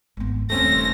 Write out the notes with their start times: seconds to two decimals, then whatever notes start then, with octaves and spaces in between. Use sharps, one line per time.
0.17 G#1 B3
0.50 D#1 A3 C4 C#4 A#6